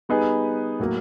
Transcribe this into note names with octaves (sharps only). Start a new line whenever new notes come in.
G3 B3 D#4 G#4 B4
A2 F#3 A#3